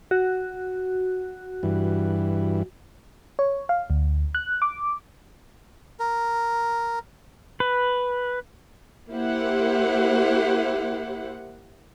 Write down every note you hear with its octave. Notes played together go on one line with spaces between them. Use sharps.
F#4
G2 E3
C#5
F5
D2
F#6
D6
A#4
B4
A#3 E4 G4 C5 F#5